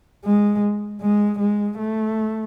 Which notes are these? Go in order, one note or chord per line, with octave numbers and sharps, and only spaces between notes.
G#3
G#3
G#3
A3